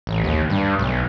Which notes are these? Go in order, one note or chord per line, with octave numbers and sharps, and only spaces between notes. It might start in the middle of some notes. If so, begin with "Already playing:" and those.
A1
D#2
G2
B1